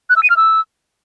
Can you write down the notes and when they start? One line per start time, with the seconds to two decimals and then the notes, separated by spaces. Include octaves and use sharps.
0.09 F#6
0.16 E6
0.23 D#7
0.30 F6
0.37 E6